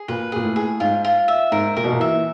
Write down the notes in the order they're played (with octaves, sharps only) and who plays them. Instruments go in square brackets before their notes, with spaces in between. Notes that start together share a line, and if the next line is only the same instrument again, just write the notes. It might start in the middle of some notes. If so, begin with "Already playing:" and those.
Already playing: [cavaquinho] G#4
[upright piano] A#2 [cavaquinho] B4
[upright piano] A#2 [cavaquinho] G#4
[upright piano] A2
[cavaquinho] G#4
[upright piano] G#2 [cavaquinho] F4
[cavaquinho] F4
E5
[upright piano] G#2 [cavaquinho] A#4
[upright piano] A#2 [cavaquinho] A#4
[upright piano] B2
A#2
[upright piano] E3 [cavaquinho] E5